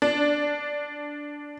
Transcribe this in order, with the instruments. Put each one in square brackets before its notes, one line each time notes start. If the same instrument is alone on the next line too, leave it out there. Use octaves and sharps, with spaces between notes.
[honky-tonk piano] D4